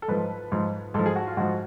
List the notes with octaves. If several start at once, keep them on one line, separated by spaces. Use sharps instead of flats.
A4
G#2 F3 B4
G#2 F3
G#2 F3 A4
G#4
F#4
F4
G#2 F3 F#4